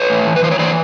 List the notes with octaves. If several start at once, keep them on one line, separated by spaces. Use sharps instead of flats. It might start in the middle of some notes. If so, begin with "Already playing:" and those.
Already playing: B4 C#5
A2
E3
B4
E3 C5
C#5
E3 C5 D5